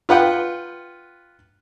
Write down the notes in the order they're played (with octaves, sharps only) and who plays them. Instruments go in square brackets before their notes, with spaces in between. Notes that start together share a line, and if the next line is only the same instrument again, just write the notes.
[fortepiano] F4 B4 F#5 G5